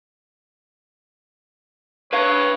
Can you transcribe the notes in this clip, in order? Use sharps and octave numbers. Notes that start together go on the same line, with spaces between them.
B4 C#5 F5